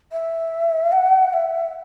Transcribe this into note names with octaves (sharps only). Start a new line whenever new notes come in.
E5
F#5
E5